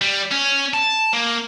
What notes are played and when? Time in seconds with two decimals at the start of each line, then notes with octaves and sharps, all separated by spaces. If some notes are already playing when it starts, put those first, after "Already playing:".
0.02 G3
0.32 C#4
0.73 A5
1.13 A#3